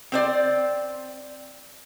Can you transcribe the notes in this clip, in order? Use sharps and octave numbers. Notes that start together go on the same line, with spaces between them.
C4 C5 D5